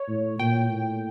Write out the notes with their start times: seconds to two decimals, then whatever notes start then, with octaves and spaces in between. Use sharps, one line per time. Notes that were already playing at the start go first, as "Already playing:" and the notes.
Already playing: C#5
0.09 A2
0.39 A#2 G5
0.69 A2